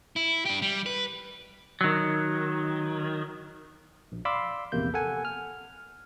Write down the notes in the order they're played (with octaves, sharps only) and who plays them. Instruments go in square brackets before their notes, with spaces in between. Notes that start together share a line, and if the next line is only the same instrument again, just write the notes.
[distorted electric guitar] E4
D4 G4
G3
B4
[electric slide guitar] D#3 F#3
[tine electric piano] A#1
D5 F5 B5 C6 D6 E6
A#1 E2 C3 A#3 G6
A4 F#5 G#5
F6